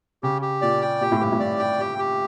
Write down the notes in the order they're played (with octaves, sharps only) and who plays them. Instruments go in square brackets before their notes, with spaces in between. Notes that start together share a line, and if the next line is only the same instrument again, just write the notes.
[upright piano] C#3 [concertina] G4
[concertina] G4
[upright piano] A#2 [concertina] D5
[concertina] G5
[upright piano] A#2 [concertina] G4
[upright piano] A2
[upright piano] G2 [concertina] G4
[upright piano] A2
[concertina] D5
G5
G4
G4